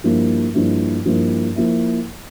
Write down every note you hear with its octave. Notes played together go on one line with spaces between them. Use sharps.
G2 F3 A#3 E4
G2 F3 A#3 E4
G2 F3 A#3 E4
F3 A#3 E4